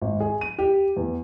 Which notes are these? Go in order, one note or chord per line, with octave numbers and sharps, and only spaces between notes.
G#1
G#4
D#7
G4
E2